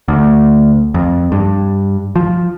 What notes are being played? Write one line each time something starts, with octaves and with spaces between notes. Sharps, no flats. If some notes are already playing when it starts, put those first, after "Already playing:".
D2
F2
G2
F3